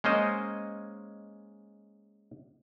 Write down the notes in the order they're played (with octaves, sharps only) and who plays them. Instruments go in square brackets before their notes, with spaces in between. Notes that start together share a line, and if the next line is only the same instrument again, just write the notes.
[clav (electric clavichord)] G#3 A#3 C#4 C5 D#5